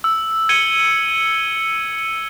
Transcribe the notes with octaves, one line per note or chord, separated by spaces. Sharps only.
E6
G#6 C#7 D#7 F#7 G7